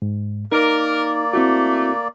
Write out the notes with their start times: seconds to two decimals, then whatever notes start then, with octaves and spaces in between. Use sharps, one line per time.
0.02 G#2
0.52 A#3 D#4 A#4 D5
1.33 A3 C4 E4 F#4